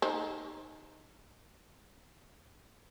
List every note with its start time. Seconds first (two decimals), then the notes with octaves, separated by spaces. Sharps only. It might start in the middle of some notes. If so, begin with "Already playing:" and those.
0.02 D#4 C5